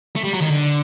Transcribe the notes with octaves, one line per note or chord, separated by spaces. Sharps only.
A3
G3
F#3
D#3
D3